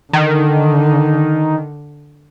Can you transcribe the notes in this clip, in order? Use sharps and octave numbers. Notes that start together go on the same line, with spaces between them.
D3 D#3